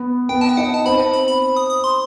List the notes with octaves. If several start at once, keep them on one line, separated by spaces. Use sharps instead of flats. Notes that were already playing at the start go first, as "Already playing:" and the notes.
Already playing: B3
B3 G5
A5
G5
D#4 F#5
A5
C4 B5
B5
B5
D#6
D#6
C6